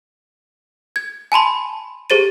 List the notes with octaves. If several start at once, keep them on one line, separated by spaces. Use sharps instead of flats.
G#6
G#5 A5 B5 C6
G4 G#4 C5 A6 D#7